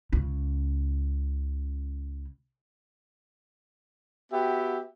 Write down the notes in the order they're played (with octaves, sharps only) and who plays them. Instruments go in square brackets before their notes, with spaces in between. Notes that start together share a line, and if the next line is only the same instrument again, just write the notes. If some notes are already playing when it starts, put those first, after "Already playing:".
[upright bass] C#2 C#3
[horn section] B3 F#4 G4 E5 G5